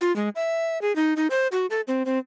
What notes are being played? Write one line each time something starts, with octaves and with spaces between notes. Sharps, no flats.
F4
G#3
E5
G#4
D#4
D#4
C5
F#4
A4
C4
C4